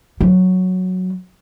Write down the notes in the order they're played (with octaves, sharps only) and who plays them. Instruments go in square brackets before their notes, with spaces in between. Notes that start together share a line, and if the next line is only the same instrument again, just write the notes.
[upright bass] F#3